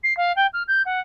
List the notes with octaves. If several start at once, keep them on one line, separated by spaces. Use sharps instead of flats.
C7
F5
G5
F6
G6
F#5